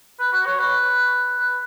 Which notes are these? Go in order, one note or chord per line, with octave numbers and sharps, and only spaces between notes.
B4
F#4
C#5
B4
B4